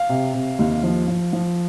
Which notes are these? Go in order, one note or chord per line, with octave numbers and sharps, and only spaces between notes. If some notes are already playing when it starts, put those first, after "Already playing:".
Already playing: F5
C3
C3
D#2
F3
F3
F3